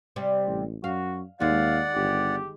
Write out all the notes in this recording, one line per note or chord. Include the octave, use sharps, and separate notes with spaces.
C3 G3
A1
F#2 F#4 F5
D#2 D#3 G#3 D5 F5 F#5
G1 G4